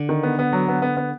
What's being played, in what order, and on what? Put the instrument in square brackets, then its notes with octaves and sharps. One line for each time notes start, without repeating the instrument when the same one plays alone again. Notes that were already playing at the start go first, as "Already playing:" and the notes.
Already playing: [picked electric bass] D3
[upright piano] D#3
B3
B3
F#3
B3
B3
B3